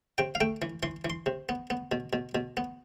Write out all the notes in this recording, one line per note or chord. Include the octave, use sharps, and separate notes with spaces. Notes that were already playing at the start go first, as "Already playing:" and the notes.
C3 G5
F5
A3 G5
E3
E3 C6
E3
C6
C3
B3
B3
B2
B2
B2
B3